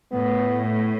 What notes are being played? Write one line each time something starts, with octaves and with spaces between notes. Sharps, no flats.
A2 B3